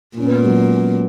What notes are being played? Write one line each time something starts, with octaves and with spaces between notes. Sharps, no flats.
A#2 C#4
B3
G#3
F#3